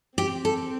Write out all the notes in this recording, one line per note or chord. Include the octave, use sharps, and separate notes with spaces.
C4 G4
A4